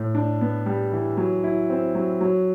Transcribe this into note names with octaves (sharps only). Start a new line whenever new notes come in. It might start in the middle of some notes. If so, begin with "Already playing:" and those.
Already playing: A2
D4
B3
G3
E3
F#3
E4
C4
F#3
F#3